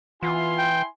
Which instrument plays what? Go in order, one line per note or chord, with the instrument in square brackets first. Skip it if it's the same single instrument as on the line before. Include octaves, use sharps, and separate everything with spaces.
[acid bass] E3 [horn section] B3 F4 [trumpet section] E4 G#5 C6
[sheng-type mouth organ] G5